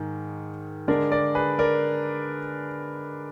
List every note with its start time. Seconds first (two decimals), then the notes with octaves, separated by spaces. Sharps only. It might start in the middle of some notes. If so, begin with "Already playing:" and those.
Already playing: G#2 D#3
0.88 D3 G#3 D4 A#4 D5
1.12 A#4 D5
1.35 G#4 B4
1.59 A#4 D5